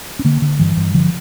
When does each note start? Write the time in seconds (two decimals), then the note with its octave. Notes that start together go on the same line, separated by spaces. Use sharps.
0.19 C#4
0.25 D3 A#3
0.42 D3
0.59 G2 E3
0.76 G2
0.94 D3 F3